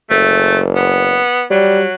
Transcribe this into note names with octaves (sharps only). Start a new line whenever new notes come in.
F#1 A3
B3
F#3 G3